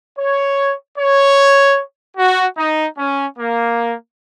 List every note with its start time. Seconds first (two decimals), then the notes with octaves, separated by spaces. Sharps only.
0.16 C#5
0.97 C#5
2.17 F#4
2.56 D#4
2.97 C#4
3.38 A#3